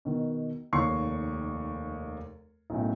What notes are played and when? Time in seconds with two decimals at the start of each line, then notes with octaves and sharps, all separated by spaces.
0.05 B2 D#3
0.73 F1 D#2 C#5 C#6 C7
2.70 B1 F#2 A2